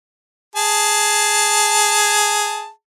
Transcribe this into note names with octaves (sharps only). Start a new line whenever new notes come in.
G#4 A5